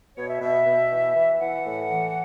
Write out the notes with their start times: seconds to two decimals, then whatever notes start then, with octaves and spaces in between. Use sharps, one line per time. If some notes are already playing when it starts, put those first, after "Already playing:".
0.16 B2 C#5
0.29 E5
0.41 B2 E5
0.66 B2
0.91 E3
1.16 E3
1.40 E3 F#5
1.65 A2
1.90 E3